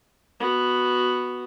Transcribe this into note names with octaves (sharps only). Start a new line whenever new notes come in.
B3 F#4